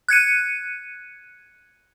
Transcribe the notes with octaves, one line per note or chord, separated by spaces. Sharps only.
F#6 G#6 C#7 D#7